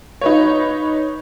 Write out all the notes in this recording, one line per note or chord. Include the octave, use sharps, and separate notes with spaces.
D#4 B4 C#5